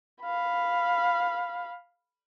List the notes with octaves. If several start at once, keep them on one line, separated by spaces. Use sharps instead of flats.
F5 B5